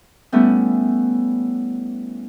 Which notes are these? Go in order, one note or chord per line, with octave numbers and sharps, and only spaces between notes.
G3 A3 B3 C#4 E4